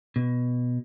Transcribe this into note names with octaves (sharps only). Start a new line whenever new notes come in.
B2